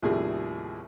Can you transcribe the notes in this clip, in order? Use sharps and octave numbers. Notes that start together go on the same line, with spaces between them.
A1 D#2 C3 F3 G3 G#4